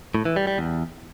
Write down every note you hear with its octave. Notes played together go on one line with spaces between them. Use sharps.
A2
E3
G3
G3
E2